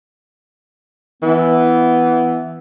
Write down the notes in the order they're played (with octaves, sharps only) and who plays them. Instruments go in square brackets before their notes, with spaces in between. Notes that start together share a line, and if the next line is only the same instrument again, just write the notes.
[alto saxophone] E3 [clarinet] B3